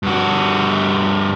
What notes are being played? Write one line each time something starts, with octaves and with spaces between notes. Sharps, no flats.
G2 F#4